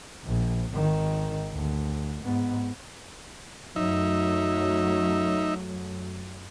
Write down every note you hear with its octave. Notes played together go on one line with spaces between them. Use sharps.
A#1
G#1 D#3
D2
G#2 B3
F#2 F#3 A3 D#4 E5